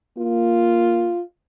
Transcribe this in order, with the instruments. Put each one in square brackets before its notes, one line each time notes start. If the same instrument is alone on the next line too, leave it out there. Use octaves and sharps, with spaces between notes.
[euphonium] A#3 [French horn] F4